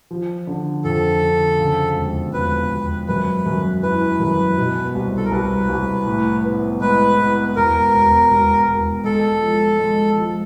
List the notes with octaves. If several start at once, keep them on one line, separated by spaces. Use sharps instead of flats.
F3
D3
F2 A4
D3
C#3
E1
E1 B4
E1
F#2 B4
F#2
E3 B4
F#2
B2
C2
A4
A#4
C2 B4
C2
A2
B3
G#3 B4
B3
E1 A#4
E1
E1
E1
G#3 A4
F3
G#3
F3